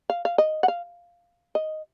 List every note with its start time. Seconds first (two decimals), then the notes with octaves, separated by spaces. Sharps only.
0.10 F5
0.25 F5
0.38 D#5
0.63 F#5
0.68 F5
1.55 D#5